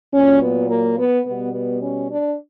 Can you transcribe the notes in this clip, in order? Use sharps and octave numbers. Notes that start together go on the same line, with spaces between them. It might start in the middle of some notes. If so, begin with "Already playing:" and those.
A#2 F#3 C#4
B3
A#3
B3
B2 G3 B3
B3
C#4
D4